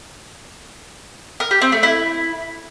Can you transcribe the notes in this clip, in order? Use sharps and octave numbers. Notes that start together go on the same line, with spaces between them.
A#4
G4
C4
A3
E4